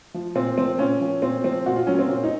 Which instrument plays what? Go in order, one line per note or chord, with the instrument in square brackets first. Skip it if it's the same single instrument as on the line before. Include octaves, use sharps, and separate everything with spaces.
[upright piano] F3
A#2 C4
F3 C4
A#2 C#4
F3
A#2 C4
F3 C4
A#2 F#4
F4
F#3 C#4
C4
A#2
D#4